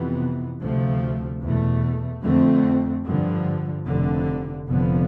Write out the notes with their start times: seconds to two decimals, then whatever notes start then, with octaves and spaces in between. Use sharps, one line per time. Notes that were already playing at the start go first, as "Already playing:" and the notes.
Already playing: F2 C3 E3 B3
0.60 D2 C3 F3 A3
1.42 E2 B2 A3
2.23 F2 D3 A3 C4
3.05 G2 D3 F3
3.86 F1 F2 D3
4.68 F1 F2 D3 F3 B3